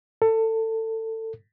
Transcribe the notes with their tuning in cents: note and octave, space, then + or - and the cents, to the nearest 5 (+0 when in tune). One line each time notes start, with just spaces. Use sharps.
A4 +25